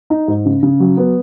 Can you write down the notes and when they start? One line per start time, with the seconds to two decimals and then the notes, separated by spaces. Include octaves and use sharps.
0.10 D#4
0.28 G#2
0.46 C#3
0.63 C#3
0.80 F#3
0.97 B3